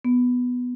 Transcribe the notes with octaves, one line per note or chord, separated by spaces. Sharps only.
B3